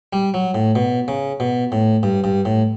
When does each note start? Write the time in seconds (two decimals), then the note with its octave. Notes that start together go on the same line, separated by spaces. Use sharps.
0.13 G3
0.34 F#3
0.54 A2
0.75 B2
1.08 C#3
1.40 B2
1.72 A2
2.03 G2
2.24 G2
2.45 A2